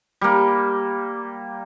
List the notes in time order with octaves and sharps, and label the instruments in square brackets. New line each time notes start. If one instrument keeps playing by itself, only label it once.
[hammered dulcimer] G3 A#3